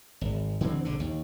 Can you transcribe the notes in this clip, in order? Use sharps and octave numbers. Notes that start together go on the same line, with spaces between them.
G#1
D3 E3 B3 C4
A#1 D3
D#2